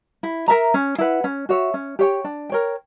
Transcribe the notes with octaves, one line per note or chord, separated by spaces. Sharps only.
E4
A#4 E5 A#5
C#4
E4 B4 F#5
C#4
F#4 C#5 E5
C#4
G4 C#5 G5
D4
A#4 C#5 G5